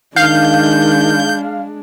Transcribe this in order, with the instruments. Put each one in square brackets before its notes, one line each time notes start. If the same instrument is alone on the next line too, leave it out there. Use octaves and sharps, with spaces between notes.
[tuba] D#3 [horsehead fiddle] G#3 D4 [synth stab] F5 [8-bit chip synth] G6